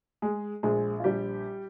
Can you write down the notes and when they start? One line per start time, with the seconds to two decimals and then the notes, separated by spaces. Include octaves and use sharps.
0.22 G#3 G#4
0.63 A#1 G#3 G#4
1.00 F4
1.04 A#1 G3 G4